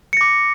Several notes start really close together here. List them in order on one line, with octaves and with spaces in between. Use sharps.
C#7 A#6 D6